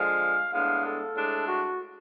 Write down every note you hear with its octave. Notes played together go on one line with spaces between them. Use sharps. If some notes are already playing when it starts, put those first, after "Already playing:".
Already playing: D3 F3 G#3 F5
A2 G#3 B3 D4 F5
A4
A2 G#3 D4
F#4